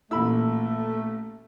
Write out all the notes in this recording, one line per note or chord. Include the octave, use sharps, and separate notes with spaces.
A1 A#2 A3 E4 B5 E6